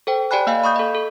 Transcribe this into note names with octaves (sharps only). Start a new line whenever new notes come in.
A4 C5 G5
G4 D5 G5 G#5 B5 F#6
A#3 D#5 F5 G#5 B5
B5 C#6 D#6 G6
A4 D#5
A4